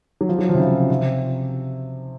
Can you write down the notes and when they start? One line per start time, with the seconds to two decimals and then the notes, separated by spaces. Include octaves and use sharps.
0.21 F#3
0.29 F3
0.39 F#3
0.49 F3
0.54 C3
0.59 C#3
0.90 C3